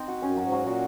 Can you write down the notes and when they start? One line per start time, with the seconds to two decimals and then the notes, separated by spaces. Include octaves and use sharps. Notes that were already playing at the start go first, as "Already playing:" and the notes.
Already playing: C4 D#4
0.08 F#4
0.22 F#2 C#4
0.37 F#3
0.42 G#2
0.52 F#3
0.62 A#2
0.67 F#4